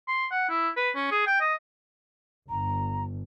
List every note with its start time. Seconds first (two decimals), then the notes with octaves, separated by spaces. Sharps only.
0.08 C6
0.31 F#5
0.49 E4
0.77 B4
0.95 C#4
1.12 G#4
1.27 G5
1.41 D#5
2.49 G1 A#5